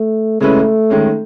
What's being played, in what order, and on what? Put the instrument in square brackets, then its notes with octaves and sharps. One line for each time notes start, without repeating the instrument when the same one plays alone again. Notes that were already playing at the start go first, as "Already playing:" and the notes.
Already playing: [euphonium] A3
[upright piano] C#3 G#3 C#4 E4 B4 [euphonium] A3
[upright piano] D#3 G#3 C#4